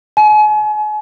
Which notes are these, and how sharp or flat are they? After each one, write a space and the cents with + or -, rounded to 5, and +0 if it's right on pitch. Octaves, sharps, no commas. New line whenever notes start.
G#5 +40